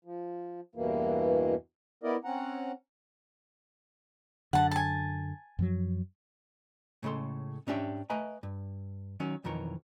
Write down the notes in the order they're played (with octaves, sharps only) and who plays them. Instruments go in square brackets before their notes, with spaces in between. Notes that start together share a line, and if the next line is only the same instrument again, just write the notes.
[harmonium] F3
E2 G2 B2 E3 A#3
B3 E4 A#4 D5 D#5
C4 C#4 F#5 A#5
[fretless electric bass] F#2 D3 [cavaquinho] F#5 A5
[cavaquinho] G#5 A5
[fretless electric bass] F#2 F3 F#3
[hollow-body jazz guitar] A2 C#3 G#3 A4 C6
G#2 C#4 D4 G4 E5
A3 A#4 B4 D#5 G#5 A#5
G2
D#3 F#3 C#4
B1 F2 D#3 E3 A#4 C#5